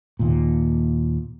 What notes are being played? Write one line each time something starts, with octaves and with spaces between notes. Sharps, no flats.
D#2 A#2